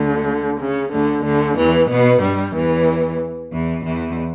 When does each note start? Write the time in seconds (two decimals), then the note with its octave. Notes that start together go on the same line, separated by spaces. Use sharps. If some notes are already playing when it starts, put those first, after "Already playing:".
Already playing: D2 D3
0.60 C#3
0.92 D2 D3
1.24 D2 D3
1.57 E2 E3
1.89 B2 B3
2.21 G2 G3
2.55 E2 E3
3.52 E2 E3
3.84 E2 E3